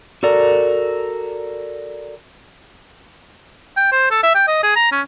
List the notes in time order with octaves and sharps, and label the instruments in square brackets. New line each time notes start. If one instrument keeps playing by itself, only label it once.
[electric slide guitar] F#4 A4 A#4 D5
[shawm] G5
C5
A4
E5
G5
D#5
G#4
A#5
C#4